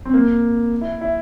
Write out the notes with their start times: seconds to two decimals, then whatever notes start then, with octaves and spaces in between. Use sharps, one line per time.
0.05 C4
0.14 A#3
0.81 E4
1.01 E4